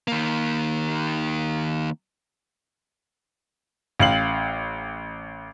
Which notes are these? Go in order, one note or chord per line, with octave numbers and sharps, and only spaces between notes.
D#3 A#3
A1 F5 F#7